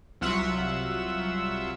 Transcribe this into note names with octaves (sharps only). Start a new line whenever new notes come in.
C2 F#3 F4 E5 F#5 E6